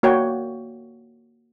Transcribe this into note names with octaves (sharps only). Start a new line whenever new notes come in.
A#3 F#4 C#5 D5 G5